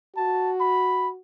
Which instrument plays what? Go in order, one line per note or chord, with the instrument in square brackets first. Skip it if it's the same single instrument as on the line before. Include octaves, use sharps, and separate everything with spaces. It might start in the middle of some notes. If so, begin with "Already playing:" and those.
[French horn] F#4 [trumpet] A5
[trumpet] B5